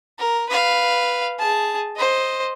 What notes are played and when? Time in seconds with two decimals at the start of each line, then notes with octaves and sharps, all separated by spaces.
0.19 A#4
0.49 B4 F5
1.39 G#4 A5
1.97 C5 D#5